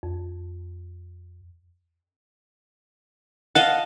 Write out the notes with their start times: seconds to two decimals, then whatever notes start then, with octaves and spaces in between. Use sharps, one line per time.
0.03 F2
3.55 D#5 F5 F#5 A5